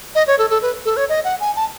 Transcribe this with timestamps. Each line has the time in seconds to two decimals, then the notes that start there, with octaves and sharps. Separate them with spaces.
0.15 D#5
0.27 C#5
0.39 A4
0.50 A4
0.62 B4
0.85 A4
0.97 C#5
1.09 D#5
1.24 F#5
1.40 G#5
1.56 A5